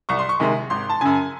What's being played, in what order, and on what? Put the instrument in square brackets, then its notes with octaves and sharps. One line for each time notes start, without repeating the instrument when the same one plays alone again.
[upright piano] C2 C#6
C6
C#6
C3 D#3 G#3
G#1 C6
A5
F#2 C#3 G#5